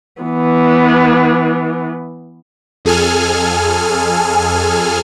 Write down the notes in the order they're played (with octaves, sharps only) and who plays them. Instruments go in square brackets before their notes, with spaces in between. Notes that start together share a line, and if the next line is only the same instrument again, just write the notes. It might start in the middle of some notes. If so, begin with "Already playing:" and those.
[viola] E3 B3
[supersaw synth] F2 G#4 A4 G#5 F6